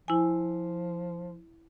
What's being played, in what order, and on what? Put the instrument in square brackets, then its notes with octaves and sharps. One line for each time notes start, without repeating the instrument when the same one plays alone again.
[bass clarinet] F3 [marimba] E4 G#5